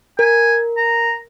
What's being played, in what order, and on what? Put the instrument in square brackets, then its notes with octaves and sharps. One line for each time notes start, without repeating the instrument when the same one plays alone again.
[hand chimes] A#4 [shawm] G#5
[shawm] A#5